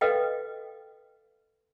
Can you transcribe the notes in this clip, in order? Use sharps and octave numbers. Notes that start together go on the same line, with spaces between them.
A4 B4 D#5 F5 G5